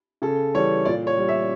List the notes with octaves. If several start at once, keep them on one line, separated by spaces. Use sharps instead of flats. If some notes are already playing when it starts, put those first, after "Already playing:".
C#3 A4
E3 G3 C#5
A#2 D5
C#5
G3
E5